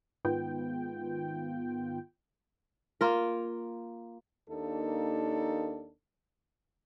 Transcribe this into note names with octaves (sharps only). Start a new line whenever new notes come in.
G#2 D#3 B3 F4 G5
A#3 F4 A#4
D#2 A#3 D4 D#4 A4